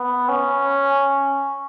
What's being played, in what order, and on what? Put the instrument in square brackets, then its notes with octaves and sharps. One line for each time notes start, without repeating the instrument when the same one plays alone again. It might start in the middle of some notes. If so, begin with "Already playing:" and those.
Already playing: [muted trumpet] B3
C#4